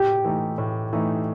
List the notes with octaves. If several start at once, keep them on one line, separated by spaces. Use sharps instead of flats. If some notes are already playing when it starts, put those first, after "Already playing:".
Already playing: A2 G4
E3 A3 D#4
A2
E3 A3 D#4